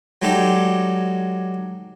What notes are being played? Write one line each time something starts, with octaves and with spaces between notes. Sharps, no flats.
F#3 G#3 D#4 G4 A4 D5